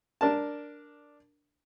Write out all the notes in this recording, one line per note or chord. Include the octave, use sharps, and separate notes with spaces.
D4 A#4 A5